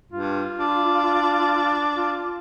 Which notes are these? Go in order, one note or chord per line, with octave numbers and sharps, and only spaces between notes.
G2 F4
D4
F4